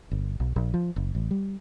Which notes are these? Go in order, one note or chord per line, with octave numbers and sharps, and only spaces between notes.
G1
B1
A#1
F3
F#1
A1
G3